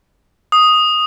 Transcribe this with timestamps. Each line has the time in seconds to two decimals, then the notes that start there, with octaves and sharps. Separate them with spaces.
0.52 D#6